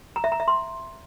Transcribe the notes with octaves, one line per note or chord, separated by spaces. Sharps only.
A#5
E5
A#5
E5
C6